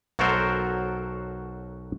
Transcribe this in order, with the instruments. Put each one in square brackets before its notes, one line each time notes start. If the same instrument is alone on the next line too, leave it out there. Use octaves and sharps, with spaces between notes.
[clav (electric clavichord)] B1 F#3 F#4 A4 A#4 C5